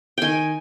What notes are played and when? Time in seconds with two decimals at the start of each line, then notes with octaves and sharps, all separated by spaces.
0.18 D#3 G5 G#5